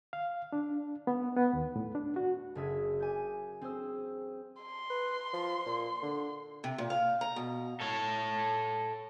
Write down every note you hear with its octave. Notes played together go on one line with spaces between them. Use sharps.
F5
D4
B3
B3
D#2
A2
D4
F#4
F#1 G#4 E5 G#6
G#5 D6 G6
C4 G#4 C5 E6
C6
B4
F3
A#2
D3
C3
A#2
F5
A#5
B2
A4 C#5